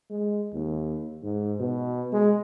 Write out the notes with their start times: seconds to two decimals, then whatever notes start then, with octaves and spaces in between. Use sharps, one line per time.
0.10 G#3
0.53 D#2
1.23 G#2
1.60 B2
2.13 G#3